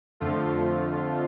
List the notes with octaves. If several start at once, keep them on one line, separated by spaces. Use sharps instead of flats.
F2 D3 F3 A3 F4